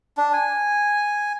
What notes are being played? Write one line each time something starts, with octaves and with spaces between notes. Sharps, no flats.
D4
G#5